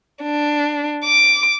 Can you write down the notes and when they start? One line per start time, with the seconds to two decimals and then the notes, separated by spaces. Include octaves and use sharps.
0.23 D4
1.05 D6